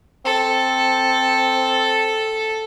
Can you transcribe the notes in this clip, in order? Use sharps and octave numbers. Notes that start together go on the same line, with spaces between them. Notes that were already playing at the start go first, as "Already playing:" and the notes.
C4 A4